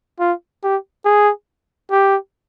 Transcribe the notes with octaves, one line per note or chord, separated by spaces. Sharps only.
F4
G4
G#4
G4